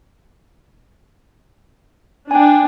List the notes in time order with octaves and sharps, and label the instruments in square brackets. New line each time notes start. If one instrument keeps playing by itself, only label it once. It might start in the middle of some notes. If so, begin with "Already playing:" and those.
[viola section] D4 [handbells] G5 G#5